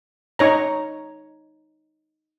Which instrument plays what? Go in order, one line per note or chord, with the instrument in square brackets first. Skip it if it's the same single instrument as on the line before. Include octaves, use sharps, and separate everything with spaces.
[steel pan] D#4 C#5 A#5